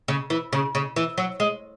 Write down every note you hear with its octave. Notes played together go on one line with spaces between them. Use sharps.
C#3
E3
C#3
C#3
E3
F#3
G#3